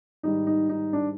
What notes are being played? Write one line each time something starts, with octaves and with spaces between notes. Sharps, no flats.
G#2 D#3 G3 D#4
D#4
D#4
D4